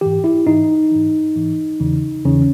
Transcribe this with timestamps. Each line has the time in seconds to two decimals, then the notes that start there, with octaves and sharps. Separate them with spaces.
0.01 G#2 E3 G4
0.24 E4
0.46 G#2 E3 D#4
0.91 G#2 E3
1.36 G#2 E3
1.80 E2 C#3 E3
2.25 E2 C#3 E3 C#4